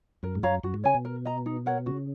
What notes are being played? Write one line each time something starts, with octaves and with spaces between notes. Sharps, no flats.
F#2 A#4
G#2
F#2 C#5 F5 A#5
F#2 F#4
G#2
C#3 C#5 G#5
B2
A#4
D#5 A#5
D#4
A#4 C#5 F#5
C#3 F#4